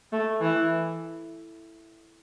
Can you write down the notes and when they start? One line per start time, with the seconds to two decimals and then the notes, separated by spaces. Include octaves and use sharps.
0.12 A3
0.41 E3